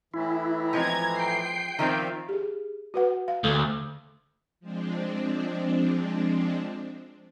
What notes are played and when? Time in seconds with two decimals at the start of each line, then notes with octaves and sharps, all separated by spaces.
0.14 A2 E3 E4
0.73 F3 G#3 C4 A#5 G#6
1.19 G5 C7
1.79 D#3 F3 C4 D5 E5 F5
2.29 G4 G#4
2.94 F#4 B4 F#5
3.28 F5
3.44 D2 A4
4.60 F3 G#3 C4 D4